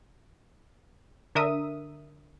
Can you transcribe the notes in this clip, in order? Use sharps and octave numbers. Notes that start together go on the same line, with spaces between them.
D3 A#4 E5 D#6